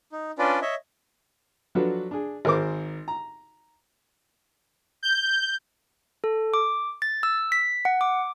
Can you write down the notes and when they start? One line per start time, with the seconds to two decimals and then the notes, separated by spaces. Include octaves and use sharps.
0.12 D#4
0.38 C#4 D4 F4 B4 D5
0.62 C#5 D#5 E5
1.75 F3 F#3 D4 F#4 A4 B4
2.11 D4 G#4
2.45 G#1 G#4 A#4 C5 D6
3.08 A#5
5.03 G6
6.24 A4
6.54 D6
7.02 A6
7.23 E6
7.52 B6
7.85 F#5
8.01 D6